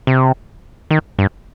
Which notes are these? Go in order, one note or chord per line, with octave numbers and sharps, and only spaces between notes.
C3
D#3
G2